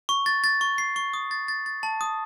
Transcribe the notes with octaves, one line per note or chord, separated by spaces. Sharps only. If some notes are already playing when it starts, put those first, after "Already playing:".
C#6
A6
A6
C#6
C7
C#6
D#6
A6
A6
A6
A5
D#6